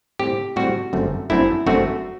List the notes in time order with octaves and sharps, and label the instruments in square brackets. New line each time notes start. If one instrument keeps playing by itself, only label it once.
[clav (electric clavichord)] A2 G3 C4 G4
A2 G3 C4 F#4
G1 F#2 D3 A3 C4
G1 F#2 D3 A3 C4 E4
G1 F#2 D3 A3 C4 F#4